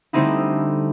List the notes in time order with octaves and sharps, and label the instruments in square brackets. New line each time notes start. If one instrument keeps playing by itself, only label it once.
[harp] D3 G3 A3 C4 D#4 E4